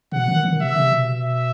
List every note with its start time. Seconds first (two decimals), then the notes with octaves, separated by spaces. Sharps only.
0.12 B2 F#5
0.28 D#3
0.44 D#3
0.60 C3 E5
0.76 C3
0.93 B2
1.09 E5